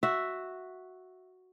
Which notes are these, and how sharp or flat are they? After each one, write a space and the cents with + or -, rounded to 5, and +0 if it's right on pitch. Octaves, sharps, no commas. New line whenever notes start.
F#4 +0 E5 +0